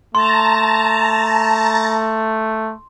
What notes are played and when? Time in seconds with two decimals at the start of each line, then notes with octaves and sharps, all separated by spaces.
0.15 A3 A5 A#5 C6